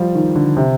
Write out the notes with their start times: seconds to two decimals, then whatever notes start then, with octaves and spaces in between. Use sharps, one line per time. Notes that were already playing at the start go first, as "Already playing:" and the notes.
Already playing: F3 G3
0.15 D#3
0.35 D3
0.57 C3